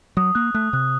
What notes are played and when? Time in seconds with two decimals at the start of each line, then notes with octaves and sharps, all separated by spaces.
0.17 F#3 D#6
0.35 A#3 F#6
0.54 A3 F#6
0.73 C3 F#6